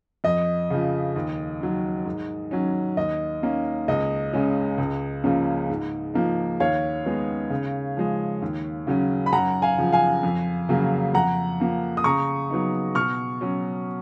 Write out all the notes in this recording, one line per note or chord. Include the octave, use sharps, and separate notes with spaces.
F2 D#5
C#3 F3
D#2
D#3 F#3
G#2
D#3 F#3 C#4
D#2 D#5
D#3 A#3 C#4
C#2 D#5
C#3 G#3 C#4
C#2
C#3 F3 A#3 C#4
G#2
F3 A#3 D#4
D#2 C#5 F5
D#3 G#3 B3 D#4
C#3
F3 G#3
D#2
C#3 F#3 C#4
B5
F#2 F#5 A#5
F5 G#5
C#3 F3
F5 G#5
F2
C#3 F#3 A#3
F2 F#5 A#5
F3 A#3
D#6
C#3 A#5 C#6
F#3 B3 D#4
B2 C#6 F6
F#3 C#4